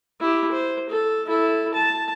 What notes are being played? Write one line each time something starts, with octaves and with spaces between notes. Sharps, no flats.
E4 G4
C5
A4
E4 A4
A5